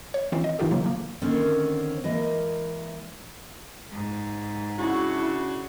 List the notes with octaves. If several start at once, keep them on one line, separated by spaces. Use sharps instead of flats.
C#5
E3 C4 C#4 D#4 F4
D#5
A2 E3 D#4 F4 G4 A4
C#3 F#3 A#3 F4
D3 A#3
D3 D#3 A#3 C4 C#4
E3 G#3 A#3 A#4 D#5
G#2
C#3 D4 E4 F#4